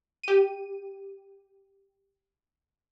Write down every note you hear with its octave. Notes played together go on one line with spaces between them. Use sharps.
G4 D#7